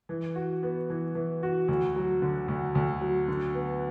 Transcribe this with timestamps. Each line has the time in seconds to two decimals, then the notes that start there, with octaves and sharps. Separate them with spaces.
0.09 E3
0.36 F#4
0.63 B3
0.90 E3
1.15 E3
1.43 F#4
1.68 D2
1.96 F#3
2.22 D3
2.48 D2
2.75 D2
3.01 F#3
3.28 D3
3.54 B3